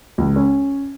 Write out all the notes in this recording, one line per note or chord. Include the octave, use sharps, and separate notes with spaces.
C#2
C#4